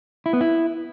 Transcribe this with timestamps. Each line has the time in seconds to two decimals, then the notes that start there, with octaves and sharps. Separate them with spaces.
0.26 E4
0.33 B3
0.41 E4